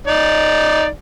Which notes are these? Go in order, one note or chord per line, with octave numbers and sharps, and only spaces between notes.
D#4 D5